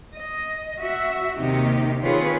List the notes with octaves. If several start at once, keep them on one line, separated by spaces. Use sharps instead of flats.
D#5
F#4 E5
D#2 C3 D#3 D#4 G4
D#3 C4 F4 G#4 B4 C#5